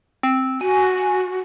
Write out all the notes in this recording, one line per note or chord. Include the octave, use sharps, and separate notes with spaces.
C4
F#4 G#5